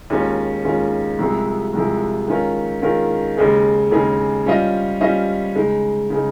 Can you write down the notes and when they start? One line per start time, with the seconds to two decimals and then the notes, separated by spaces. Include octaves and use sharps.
0.10 D#2 D#3 G#3 C#4 F4
0.64 D#2 D#3 G#3 C#4 F4
1.19 C2 C3 F3 G#3
1.73 C2 C3 F3 G#3
2.28 D#3 G#3 C#4 F4 A#4
2.82 D#3 G#3 C#4 F4 A#4
3.37 D#2 C#3 G#3 D#4 G#4
3.91 D#2 C#3 G#3 D#4 G#4
4.46 G3 C#4 F4 C5 D#5
5.01 G3 C#4 F4 C5 D#5
5.55 C#3 G#3 D#4
6.10 C#3 G#3 D#4